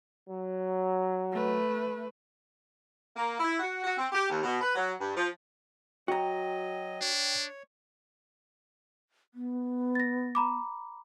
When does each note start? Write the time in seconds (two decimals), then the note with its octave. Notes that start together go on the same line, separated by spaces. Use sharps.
0.29 F#3
1.32 A3 B4
3.17 A#3
3.40 E4
3.60 F#4
3.84 F#4
3.98 C4
4.12 G4
4.30 D#2
4.44 B2
4.61 B4
4.75 F#3
4.99 G2
5.16 F3
6.08 F#3 F#4 D#5 G5 A#5
7.01 D4 C#5
9.34 B3
9.95 A6 A#6
10.35 A#5 B5 D6